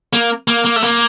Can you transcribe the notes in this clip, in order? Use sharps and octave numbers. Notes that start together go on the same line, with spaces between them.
A#3
A#3
A#3
A3
A#3